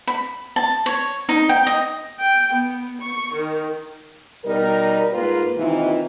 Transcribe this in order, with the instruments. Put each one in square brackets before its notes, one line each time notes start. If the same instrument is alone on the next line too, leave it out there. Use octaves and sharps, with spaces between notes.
[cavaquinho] B5
A5
C#5
D#4
G5
D#5
[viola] G5
B3
C#6
D#3
[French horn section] B2 G3 D#4 A#4
G#2 A#3 F4 B4
D#2 C3 D#3 E3 D#4 F4